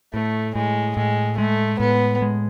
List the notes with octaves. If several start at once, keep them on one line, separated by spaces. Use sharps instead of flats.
A2 A3
A2 G#3
A2 G#3
G#3 A3
A2 B3
G#3